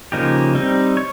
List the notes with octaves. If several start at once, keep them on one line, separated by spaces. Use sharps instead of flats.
C#3 F3 A#3 D#4 G4
G3 C4 D#4
C#5